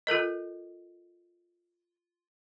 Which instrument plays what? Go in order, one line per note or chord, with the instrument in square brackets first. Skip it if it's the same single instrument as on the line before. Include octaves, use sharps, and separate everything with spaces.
[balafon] F4 A4 A#4 D#5